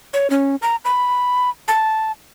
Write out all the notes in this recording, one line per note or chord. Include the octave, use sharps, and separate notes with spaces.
C#5
C#4
A#5
B5
A5